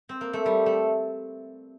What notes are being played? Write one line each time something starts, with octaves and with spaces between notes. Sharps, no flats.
C4
A#3
A3
G3
A3